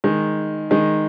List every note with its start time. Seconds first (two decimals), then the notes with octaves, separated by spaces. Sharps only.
0.04 D#3 G#3
0.71 D#3 G#3